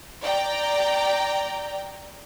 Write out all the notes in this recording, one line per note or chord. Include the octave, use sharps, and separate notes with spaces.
D5 G5 A#5